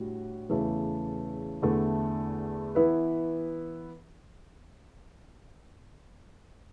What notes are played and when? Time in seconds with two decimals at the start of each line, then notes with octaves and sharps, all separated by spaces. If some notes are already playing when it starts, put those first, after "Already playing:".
Already playing: A2 G3 D4 F#4
0.50 E2 C#3 E3 A3
1.62 E2 D3 A3 E4 A4
2.75 E3 B3 E4 B4